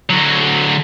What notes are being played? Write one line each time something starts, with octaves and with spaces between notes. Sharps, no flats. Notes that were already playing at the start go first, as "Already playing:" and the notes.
D3 F#3